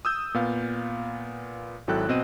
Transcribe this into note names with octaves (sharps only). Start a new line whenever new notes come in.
D#6 E6 G6
A#2 B3 F5
G#1 F#3 E4 A4 G5 F#6
B2 C4 D#5 D#7